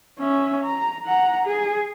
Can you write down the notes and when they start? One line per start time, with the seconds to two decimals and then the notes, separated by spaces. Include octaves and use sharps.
0.19 C#4 E5
0.64 A#5
1.05 F#5 A#5
1.46 G#4